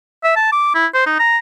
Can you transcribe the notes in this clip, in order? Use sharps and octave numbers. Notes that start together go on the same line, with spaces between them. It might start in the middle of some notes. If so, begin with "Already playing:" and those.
E5
A5
D6
E4
C5
D#4
A#5